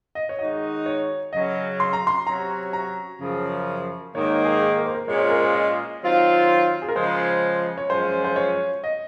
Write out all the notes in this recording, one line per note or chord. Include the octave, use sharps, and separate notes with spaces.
D#5
C#5
D#3 G#3 D#4 F#4 D#5
C#5
C#3 F#3 C#4 D#5
C6
A#5
C6
C3 F#3 C#4 F#4 A#5
A#5
F#2 C#3 F3
G#2 D#3 A#3 C#5
G#4
A#4
C5
A#4
A#2 G#3 C#4 F4 C#5
C5
A#4
C5
D#5
D#3 F#3 C4 F4
G#4
A#4
C#3 F3 G#3 C5
C#5
F#2 F3 G#3 C#4 F4 C5
C5
C#5
D#5